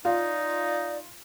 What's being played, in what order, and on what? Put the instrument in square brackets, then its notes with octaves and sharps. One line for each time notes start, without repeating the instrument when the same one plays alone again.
[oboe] D#4 [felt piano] F4 [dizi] D5